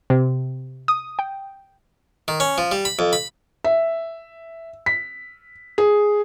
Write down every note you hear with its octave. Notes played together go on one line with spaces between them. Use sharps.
C3
D#6
G5
D#3
C#4
F3
G3
B5
F2
B5
E5
B6
G#4